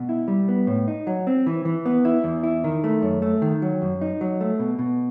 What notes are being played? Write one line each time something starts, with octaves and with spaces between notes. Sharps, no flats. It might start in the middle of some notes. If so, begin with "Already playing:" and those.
Already playing: B2
E4
G3
B3
A2
D#4
F#3
C4
E3
E3
B3
E4
E2
E4
D#3
A3
F#2
A3
D#3
F#3
F#2
D#4
F#3
A3
B2
B2